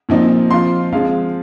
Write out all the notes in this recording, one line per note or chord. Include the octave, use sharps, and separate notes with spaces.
A#2 F3 C4 D#4
F3 C4 F4 C6
F3 G#3 C4 F5